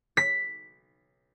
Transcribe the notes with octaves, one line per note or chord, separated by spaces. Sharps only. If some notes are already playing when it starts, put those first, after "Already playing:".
B6